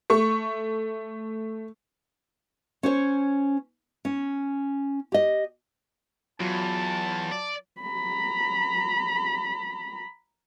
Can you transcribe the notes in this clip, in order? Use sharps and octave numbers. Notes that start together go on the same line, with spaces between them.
A3 C#6
C#4 C5 C#5
C#4
G4 D#5
E2 F#3 F4 A5
D5
A#5 B5